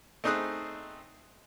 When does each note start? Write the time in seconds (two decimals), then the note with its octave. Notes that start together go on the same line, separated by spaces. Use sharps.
0.24 A3 C4 D#4 G#4 D#6 F#6